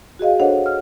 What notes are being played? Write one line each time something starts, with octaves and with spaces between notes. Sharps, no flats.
F#4 G#4 D#5 F5
D4 A4 C5 C#5 D#5 F#5
F6